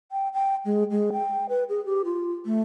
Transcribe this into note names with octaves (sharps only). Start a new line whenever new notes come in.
G5
G5
G#3
G#3
G5
B4
G#4
G4
F4
A3